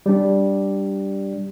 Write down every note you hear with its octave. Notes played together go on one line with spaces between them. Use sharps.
G3 D4